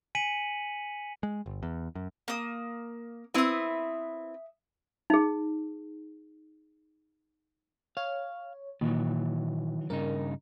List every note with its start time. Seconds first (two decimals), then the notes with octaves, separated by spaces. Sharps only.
0.15 G#5 B6 C#7 D#7 F#7
1.23 G#3
1.46 G1
1.63 E2
1.95 F#2
2.28 A#3 D#6
3.34 C4 E4 B4 E5 D#6
5.10 D#4 G#4
7.97 C#5 F5
8.81 A#2 D#3 E3 F#3
9.90 G2 C#3 D#4 A#4